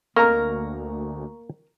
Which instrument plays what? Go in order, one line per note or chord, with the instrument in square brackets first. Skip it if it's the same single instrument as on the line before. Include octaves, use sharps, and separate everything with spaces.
[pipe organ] D2 [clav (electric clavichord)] A#3 D#5 [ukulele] A#4 [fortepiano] A#5 C#6